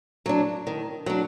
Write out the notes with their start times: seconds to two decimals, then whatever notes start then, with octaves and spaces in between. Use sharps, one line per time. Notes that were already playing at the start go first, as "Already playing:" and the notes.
0.26 F#3 D4
0.67 D#3
1.06 F#3 D4